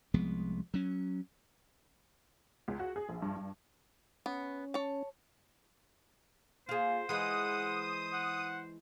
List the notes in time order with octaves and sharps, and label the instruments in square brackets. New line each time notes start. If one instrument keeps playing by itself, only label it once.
[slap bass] C2 F3 G#3 B3
F#3 C#4
[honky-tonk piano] C#2
F#4
G#4
A#1
G2
G2
[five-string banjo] B3 [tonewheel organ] C#4
[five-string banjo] C#5 A5
[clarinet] A#3 [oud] F4 G#4 [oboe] C5
[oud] E3 G#3 [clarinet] F#5 [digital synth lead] D#6
[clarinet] F#5